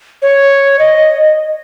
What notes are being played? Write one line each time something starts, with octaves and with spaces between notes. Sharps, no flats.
C#5
D#5